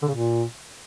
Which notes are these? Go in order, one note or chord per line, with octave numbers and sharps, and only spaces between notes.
D3
C#3
A#2